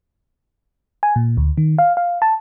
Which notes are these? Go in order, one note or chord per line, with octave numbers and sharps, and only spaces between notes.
G#5
A#2
D2
D#3
F5
F5
A5